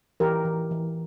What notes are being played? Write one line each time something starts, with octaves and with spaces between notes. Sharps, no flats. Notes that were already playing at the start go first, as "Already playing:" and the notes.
E3 G4 A#4
E3
E3